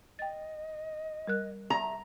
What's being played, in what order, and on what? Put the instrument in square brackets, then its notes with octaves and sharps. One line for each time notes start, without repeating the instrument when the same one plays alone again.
[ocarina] D#5 [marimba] G5 A6
[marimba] G3 A#4 F#6
[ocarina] E5 [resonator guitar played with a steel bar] A#5